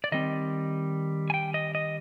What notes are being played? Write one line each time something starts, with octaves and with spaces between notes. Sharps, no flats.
D5
D#3 G3 C4 D#5
G#5
G5
D#5
D#5